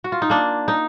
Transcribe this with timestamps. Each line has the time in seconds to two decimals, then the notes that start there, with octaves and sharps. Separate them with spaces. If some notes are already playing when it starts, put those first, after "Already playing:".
0.04 F#4
0.12 F4
0.22 D#4
0.30 A#3 D4
0.68 D#4